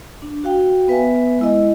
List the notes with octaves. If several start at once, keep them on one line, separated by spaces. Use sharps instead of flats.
D4
F#4 F5 G5
B3 B4 E5 G#5
G#3 E4 D#5